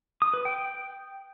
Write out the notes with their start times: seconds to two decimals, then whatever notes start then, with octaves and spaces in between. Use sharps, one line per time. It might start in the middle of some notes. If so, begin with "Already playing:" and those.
0.22 D#6
0.34 B4
0.45 G5